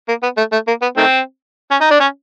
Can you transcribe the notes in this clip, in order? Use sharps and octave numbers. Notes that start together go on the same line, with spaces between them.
A#3
B3
A3
A3
A#3
B3
D#3 A3 C4
C#4
D#4
D4
C#4